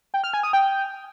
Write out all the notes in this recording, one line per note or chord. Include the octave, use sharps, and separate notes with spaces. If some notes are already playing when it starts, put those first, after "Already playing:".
G5
F6
G#5
D#6
G5